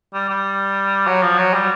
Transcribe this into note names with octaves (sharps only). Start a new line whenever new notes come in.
G3
G3
F#3
F3
F#3
G3